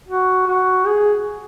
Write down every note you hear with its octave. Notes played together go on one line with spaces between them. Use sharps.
F#4
F#4
G#4